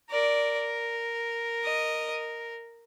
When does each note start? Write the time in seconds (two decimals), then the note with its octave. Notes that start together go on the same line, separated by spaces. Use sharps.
0.10 A#4 D5
1.64 D#5